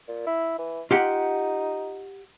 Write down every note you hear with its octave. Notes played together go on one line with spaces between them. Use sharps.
A#2
E4
E3
D#4 F4 G4 F#5